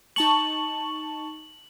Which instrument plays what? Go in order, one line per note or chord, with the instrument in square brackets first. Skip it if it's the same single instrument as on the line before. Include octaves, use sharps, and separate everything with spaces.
[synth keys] D#4 A5 C#6 [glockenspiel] F#7